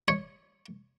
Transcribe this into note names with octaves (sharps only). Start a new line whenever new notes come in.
C#5